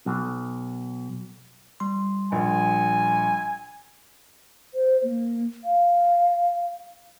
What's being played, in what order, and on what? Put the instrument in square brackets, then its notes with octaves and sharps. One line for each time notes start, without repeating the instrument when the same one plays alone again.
[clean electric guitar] B1
[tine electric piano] G3 C6
[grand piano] A#1 [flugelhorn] G#5
[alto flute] C5
A#3
F5